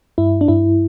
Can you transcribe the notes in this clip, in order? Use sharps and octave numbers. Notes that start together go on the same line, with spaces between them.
G2 E4
D4
G2 E4